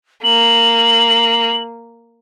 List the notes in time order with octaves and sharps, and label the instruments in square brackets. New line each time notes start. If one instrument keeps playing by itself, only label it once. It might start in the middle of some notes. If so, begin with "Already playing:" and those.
[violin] A#3 [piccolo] F#7